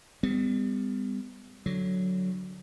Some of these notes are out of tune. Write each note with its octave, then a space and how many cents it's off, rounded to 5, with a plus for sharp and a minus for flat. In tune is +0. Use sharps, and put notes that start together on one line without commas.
G3 +35 B3 +40
D3 +0 F#3 +0